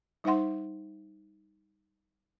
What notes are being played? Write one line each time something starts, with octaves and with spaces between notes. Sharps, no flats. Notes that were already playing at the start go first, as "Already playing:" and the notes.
G3 D#4 C5 E5 F#5 C6